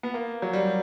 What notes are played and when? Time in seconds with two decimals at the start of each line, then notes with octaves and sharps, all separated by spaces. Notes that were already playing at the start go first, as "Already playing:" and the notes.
0.03 B3
0.14 A#3
0.42 F#3
0.53 G3